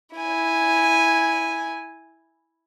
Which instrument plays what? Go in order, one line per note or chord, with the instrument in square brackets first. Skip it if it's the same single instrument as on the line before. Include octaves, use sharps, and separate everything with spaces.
[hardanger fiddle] E4 G#5